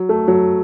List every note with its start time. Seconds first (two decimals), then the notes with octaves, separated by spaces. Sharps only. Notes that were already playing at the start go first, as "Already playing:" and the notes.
Already playing: F#3
0.09 A3
0.28 F#3